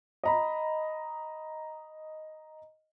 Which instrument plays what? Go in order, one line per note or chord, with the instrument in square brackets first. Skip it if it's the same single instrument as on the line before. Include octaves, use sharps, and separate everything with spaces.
[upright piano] D#5 A#5 B5